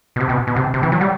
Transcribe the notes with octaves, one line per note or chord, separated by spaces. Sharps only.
B2
C3
B2
B2
C3
C3
E3
F#3
G3